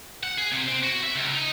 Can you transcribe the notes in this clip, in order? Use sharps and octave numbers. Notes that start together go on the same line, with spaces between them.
F#5
G#4
C3
C4
F#4
E5
C#2
D#4